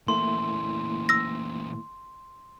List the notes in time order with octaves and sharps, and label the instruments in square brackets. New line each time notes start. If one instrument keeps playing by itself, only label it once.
[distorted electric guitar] A#2 E3 [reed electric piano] A3 A#3 E4 [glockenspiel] C6
[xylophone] E6 A#6